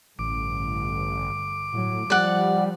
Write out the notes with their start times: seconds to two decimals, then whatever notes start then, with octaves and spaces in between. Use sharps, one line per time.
0.19 A1 G2 D3 D6
1.74 A2 F#3
2.10 F3 G3 D5 F#5